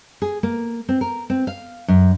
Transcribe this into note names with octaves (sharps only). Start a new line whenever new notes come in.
G#4
A#3
C4
A#4
C4
F5
F#2